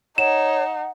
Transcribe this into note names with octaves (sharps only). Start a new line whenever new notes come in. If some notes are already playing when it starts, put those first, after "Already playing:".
D#4 C#5 F#5 E7